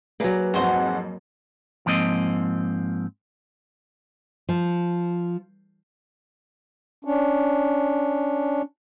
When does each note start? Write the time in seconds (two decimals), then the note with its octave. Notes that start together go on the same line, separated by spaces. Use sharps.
0.20 F#3 A#3 G#4 B4 D5
0.54 F2 G#2 F#4 C5 F#5
1.86 G#2 F3 A#3 C4 D#5
4.49 F3
7.05 C#4 D4